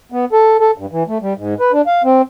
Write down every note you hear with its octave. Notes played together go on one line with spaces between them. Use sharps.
B3
A4
A4
G2
E3
A3
G3
G#2
B4
D4
F5
C4